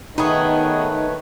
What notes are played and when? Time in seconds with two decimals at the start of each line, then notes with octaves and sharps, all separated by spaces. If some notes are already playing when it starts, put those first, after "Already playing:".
0.18 D#3 A3 B3 D#4 G#4 B4 C#5